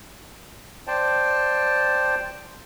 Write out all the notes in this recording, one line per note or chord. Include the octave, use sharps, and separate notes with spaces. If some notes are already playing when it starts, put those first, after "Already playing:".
C5 D5 G5 A5